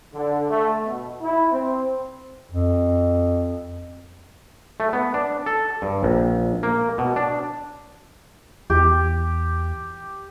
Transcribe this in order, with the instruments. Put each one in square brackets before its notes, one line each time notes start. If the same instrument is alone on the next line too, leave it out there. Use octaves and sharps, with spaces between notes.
[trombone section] D3
A3
B2
E4
C4
[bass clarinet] F2
[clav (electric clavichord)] A3
B3
D4
A4
G2
A#1
A#3
B2
D4
[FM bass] E2 [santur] G4